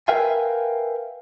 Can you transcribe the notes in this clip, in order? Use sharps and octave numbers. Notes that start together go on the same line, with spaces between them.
A#4 B4 E5 F5 G5 G#5